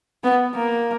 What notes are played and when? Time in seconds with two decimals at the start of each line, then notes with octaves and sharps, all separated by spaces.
0.24 B3
0.55 A#3